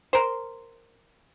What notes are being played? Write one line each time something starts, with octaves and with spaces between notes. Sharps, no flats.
A#4 C5